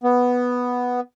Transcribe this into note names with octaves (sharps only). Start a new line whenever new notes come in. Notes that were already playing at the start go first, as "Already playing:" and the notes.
B3